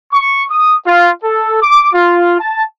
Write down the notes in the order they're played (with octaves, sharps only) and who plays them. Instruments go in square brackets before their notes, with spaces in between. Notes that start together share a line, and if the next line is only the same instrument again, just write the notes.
[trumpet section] C#6
D#6
F4
A4
D6
F4
A5